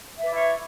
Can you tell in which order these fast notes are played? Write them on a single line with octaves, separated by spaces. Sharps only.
E5 B4 D5 E4 C#5